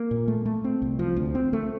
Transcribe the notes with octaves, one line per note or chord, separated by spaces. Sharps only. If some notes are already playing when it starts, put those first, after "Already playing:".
Already playing: A#3
A#2
A3
A3
C4
C2
F3
D2
C4
A3